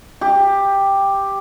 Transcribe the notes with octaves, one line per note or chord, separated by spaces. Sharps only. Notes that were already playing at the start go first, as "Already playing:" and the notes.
G4